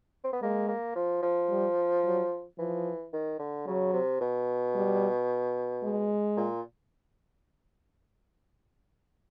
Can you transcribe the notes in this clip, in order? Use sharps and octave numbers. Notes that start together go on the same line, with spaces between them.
C4
B3
G#3 A#3
A#3
F3
F3
G3
F#3
E3 F3
D#3
D3
C#3 F#3
C3
B2
G3
G#3
A#2